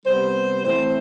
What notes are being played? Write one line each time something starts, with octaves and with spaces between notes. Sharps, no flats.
C3 G3 B3 C5
A2 E3 A3 C4 C5